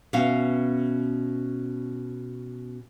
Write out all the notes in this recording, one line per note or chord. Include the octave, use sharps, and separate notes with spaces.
B2 C#4 E5 F5